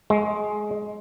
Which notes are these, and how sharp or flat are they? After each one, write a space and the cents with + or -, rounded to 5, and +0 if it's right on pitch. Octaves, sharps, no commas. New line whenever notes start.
G#3 +15